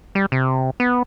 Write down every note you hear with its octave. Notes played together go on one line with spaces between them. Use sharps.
G3
C3
B3